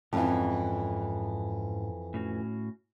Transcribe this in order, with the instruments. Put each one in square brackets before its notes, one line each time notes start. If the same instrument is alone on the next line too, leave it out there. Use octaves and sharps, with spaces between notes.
[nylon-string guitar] F2 E3 [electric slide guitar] G#2 C#4
[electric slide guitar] A2 C#4 F#4